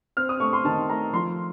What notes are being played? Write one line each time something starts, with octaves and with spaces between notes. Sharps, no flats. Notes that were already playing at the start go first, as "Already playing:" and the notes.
C4 F6
D#6
A3 C#6
C6
D#3 A5
A3 A#5
F3 C6